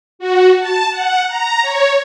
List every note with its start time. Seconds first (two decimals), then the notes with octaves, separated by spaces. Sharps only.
0.19 F#4
0.58 A5
0.90 F#5
1.27 A#5
1.62 C#5